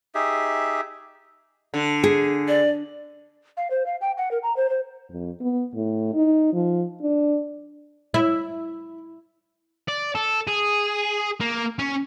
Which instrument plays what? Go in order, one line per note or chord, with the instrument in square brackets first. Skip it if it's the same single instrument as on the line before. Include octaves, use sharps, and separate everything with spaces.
[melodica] D#4 G4 G#4 E5
[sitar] D3
[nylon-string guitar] G#4
[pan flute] D5
[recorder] F5
C5
F5
G5
F#5
A#4
A#5
C5
C5
[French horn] F2
B3
A2
D#4
F3
D4
[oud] E4
[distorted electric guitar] D5
A4
G#4
A#3
C#4